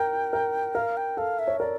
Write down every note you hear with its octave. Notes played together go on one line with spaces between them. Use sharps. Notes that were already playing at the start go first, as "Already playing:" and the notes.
Already playing: A#4 G5
A#4
A#4 F5
G5
A4 F5
E5
C#5
A#4 D5